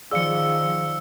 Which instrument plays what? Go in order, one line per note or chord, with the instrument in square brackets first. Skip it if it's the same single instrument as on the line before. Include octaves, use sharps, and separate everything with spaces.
[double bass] D#3 F3 [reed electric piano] G#4 D5 F5 [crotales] E6 C#7